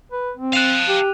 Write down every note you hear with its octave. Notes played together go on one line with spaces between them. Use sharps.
B4
C4
F5 A5 F#6 D#7 F7
G4